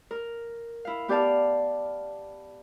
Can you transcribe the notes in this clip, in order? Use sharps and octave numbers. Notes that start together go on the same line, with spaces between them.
A#4
E4 F5
B3 G4 D5 F5 A5